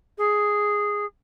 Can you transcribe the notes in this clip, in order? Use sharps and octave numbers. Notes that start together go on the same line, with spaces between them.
G#4